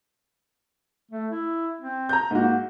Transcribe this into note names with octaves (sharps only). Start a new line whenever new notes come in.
A3
E4
C4
A#5 G6
G#2 A#3 F#4